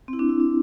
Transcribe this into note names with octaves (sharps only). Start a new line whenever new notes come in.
C4
E4
D4
E4
D4